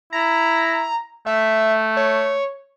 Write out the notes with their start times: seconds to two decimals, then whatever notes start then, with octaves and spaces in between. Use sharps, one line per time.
0.13 E4 A#5
1.26 A3 E5
1.97 C#5